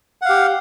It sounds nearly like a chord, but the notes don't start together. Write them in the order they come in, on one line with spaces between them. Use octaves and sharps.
F#5 F5 G4